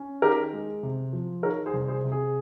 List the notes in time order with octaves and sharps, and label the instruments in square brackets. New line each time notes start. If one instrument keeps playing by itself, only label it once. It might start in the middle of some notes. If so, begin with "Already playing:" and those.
Already playing: [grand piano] C#4
D#3 G4 A#4
G#3
C3
F3
D#3 A#4 C#5
G#4 C5
C2
G#4 C5
C3
G#4